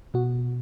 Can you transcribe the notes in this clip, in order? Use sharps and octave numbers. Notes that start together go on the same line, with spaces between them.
B2 F#4